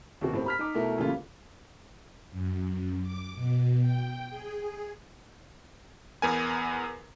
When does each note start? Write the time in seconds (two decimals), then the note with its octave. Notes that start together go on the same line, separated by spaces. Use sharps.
0.21 D#2 C3 F#4
0.34 A2 C4 G4
0.46 B5 F6 B6
0.59 D#4 D6
0.74 B2 A3 E4 A#4
0.98 A#2 C#3 E3 G3 A3 F4
2.32 F#2
3.02 D6
3.35 B2
3.82 G5
4.30 G#4
6.22 E2 B3 A#4 G#5